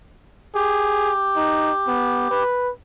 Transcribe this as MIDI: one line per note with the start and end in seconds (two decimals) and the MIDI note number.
0.55 2.43 67
0.55 1.12 68
1.36 1.71 63
1.88 2.27 59
2.31 2.71 71